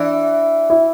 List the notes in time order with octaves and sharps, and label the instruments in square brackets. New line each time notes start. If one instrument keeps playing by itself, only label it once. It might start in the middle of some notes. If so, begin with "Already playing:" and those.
Already playing: [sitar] E3 [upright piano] D4
[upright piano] E4